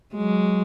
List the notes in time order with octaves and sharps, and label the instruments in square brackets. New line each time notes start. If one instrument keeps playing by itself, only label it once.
[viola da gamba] F#3 G#3